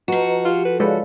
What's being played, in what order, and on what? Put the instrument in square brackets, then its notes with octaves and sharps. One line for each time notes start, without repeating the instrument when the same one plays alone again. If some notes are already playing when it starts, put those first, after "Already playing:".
[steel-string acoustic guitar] F3 F#4 [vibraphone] B4 D#5 A#5
[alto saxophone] F4 [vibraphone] G4
[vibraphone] A4 [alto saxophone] B4
[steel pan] G#3 B4 [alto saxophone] A4 [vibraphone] C#5 D5 F5